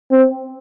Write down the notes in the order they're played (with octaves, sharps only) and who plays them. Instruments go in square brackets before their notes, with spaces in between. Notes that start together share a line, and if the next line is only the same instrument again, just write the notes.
[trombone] C4